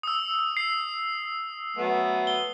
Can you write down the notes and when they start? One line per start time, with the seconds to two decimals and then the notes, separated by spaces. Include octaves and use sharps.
0.03 D#6 E6
0.57 C7
1.77 F#3 A3 B3
2.27 G7